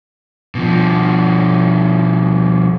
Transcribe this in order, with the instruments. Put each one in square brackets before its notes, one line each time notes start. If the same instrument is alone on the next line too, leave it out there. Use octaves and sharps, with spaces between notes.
[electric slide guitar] B2 F3